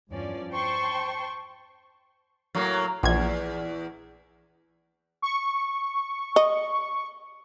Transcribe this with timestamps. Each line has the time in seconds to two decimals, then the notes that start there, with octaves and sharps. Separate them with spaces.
0.10 E2 G2 F3 C#4 D5
0.52 C5 G5 A5 C6 C#6
2.55 A2 F#3 A#3
3.03 A#1 E2 G#6
5.22 C#6
6.36 D#5